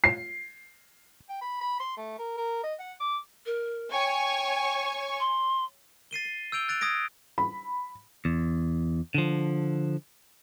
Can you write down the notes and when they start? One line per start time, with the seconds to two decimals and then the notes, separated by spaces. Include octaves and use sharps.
0.04 C7
1.29 G5
1.42 B5
1.61 B5
1.80 C6
1.97 A3
2.19 A#4
2.37 A#4
2.63 D#5
2.80 F#5
3.00 D6
3.46 A#4
3.92 C#5 G5 G#5 C#6
5.20 C6
6.11 A6 C7 D#7 G7
6.25 C7
6.52 E6 G6 D7 F7 G7
6.68 F#6 A6 D7 F7
6.81 D#6 G#6 A#6 D7
7.38 B5
8.25 E2
9.14 D3 F3